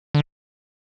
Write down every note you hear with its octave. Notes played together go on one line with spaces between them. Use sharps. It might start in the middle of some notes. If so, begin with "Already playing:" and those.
D3